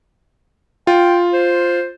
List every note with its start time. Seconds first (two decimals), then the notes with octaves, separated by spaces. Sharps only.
0.87 F4 G5
1.33 C5